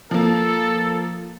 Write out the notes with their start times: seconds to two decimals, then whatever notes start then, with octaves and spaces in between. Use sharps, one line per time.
0.11 F3 A#3 A4